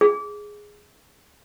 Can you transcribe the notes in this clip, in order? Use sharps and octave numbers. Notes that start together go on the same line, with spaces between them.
G#4